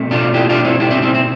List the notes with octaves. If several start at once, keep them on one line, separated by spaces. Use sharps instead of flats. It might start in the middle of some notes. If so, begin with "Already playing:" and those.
Already playing: B2 A3 C4
D4 F4
E4 G4
D4 F4
C4 E4
E4 G4
C4 E4
C4 E4
C4